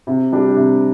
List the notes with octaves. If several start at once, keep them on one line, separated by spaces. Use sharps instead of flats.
C3
G3 D4 G4
C3